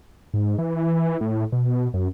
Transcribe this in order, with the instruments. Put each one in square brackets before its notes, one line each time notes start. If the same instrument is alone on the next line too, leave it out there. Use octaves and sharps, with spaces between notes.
[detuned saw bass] G#2
E3
A2
B2
F#2